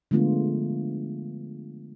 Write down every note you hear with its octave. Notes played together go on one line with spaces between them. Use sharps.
D3 F3 G#3 A3 B3 F4